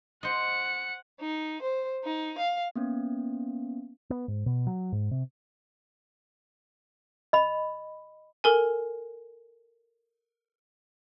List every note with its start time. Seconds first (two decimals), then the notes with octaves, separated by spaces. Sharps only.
0.23 C5 D#5 F#5 C#7
1.21 D#4
1.62 C5
2.04 D#4
2.39 F5
2.76 A#3 B3 C#4
4.10 B3
4.28 G#2
4.46 B2
4.67 F#3
4.92 G#2
5.11 C3
7.33 D#5 B5
8.44 A4 A#4 G#5